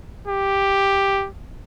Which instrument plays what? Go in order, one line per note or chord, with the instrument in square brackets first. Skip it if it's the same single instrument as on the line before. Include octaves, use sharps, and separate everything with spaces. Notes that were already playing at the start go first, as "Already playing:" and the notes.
[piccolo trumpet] G4